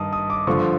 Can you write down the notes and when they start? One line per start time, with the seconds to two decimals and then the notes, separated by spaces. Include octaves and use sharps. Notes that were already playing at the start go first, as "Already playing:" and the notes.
Already playing: G2 D#3 A5 D#6
0.13 D#6
0.30 D6
0.47 G2 D3 F3 C#6